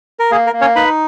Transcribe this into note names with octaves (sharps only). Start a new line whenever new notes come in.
A#4
A#3 G#4
A#4
A#3
C#4 C#5
D#4 B4 B5